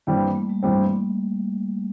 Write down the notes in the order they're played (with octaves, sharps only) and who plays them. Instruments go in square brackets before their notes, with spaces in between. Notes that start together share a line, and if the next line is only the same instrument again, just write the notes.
[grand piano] G2 E3 G3 C4 [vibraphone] A#3
[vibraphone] A#3
G3
A3
G3
[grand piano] G2 E3 G3 C4 [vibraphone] A3
[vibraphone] A#3